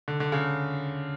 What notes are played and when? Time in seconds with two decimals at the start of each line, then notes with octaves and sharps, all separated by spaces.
0.08 D3
0.20 D3
0.32 C#3